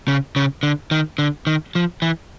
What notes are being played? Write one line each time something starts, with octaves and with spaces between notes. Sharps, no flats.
C#3
C#3
D3
D#3
D3
D#3
F3
E3